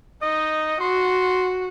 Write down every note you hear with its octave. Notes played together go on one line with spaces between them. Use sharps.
D#4 D#5
F#4 C6